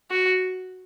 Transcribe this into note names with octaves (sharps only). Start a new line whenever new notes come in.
F#4